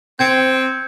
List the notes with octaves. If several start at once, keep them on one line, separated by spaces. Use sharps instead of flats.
C4 G6 G#6 C#7